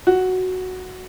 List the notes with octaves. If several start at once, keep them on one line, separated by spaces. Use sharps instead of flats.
F#4